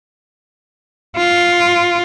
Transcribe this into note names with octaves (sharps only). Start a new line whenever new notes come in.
F4